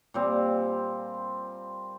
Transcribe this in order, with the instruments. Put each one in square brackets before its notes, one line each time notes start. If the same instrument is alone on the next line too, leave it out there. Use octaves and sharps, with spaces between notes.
[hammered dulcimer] A#2 G3 C4